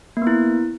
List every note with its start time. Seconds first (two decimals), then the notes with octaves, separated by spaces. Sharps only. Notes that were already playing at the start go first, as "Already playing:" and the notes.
0.17 A#3
0.22 B3
0.27 E4